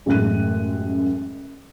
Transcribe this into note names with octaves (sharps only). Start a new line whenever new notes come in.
A1 F#2 G#3 A3 F#6 D#7